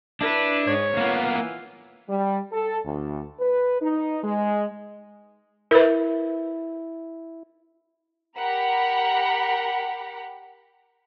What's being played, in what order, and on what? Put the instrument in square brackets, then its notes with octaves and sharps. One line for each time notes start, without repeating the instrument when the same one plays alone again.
[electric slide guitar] D4 [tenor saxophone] E4 [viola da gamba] B4
[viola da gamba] G#2 [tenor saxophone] C#5
[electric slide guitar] A#3 B3 [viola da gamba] F4
[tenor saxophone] E3
[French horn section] G3
A4
D2
B4
D#4
G#3
[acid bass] E4 [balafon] A#4 B4
[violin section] G4 A#4 F#5 A#5 B5